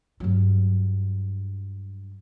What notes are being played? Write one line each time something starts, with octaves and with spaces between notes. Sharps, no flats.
G2 F#3